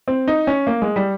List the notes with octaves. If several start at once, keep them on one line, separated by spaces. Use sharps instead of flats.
C4
D#4
C#4
A#3
G#3
G3